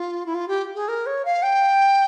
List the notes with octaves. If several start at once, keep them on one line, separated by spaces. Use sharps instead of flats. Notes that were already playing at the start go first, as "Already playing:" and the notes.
Already playing: F4
E4
F4
G4
G#4
A#4
C#5
F5
G5